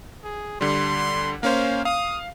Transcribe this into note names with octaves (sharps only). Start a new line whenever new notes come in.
G#4
D3 G3 C6
A#3 C#4 C5 F5
F5 D#6